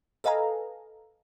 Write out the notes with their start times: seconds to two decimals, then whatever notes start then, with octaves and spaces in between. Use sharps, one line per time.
0.24 A4 B4 D#5 F5 G#5 A#5